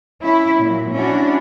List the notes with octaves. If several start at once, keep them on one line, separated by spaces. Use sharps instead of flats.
C#4 E4
A#2 F#3
C#4 D4 E4 F#4